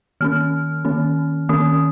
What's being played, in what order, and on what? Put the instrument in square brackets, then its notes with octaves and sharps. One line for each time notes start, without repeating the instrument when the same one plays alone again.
[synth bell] D#3 A#3 C#4 F6
D#3 A#3 C#4
D#3 A#3 C#4 D#6